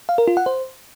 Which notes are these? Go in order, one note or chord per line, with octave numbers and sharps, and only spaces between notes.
F5
A#4
F4
F#5
C5